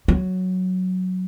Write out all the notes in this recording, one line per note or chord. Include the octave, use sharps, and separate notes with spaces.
F#3